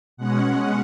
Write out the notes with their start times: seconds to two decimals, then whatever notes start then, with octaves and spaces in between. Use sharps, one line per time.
0.17 B2 G#3 C#4 F#5